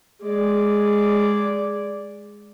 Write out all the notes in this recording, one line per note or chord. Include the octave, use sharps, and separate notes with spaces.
G#3 D5